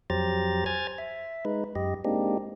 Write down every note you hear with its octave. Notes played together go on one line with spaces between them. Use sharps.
F2 F#3 G4 C5 A#5 A6
C5 G#5 F6 G#6 A6
E5
G#3 D#4 B4
F#2 G4 D#5
G#3 A#3 C4 D4 D#4 G4